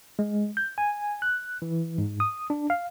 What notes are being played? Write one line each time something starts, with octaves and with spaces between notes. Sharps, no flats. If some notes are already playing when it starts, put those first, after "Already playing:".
G#3
G6
G#5
F#6
E3
G#2
D#6
D4
F5